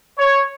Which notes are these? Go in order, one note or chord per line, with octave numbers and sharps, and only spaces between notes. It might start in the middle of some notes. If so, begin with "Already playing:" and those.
C#5